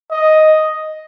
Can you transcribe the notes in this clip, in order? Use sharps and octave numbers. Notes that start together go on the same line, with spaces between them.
D#5